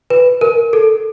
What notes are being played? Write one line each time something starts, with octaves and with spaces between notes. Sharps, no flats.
B4
A#4
A4